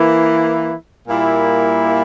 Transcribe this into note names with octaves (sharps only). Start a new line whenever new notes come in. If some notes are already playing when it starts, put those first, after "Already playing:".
Already playing: E3 A#3 E4
A#2 G3 A#3 E4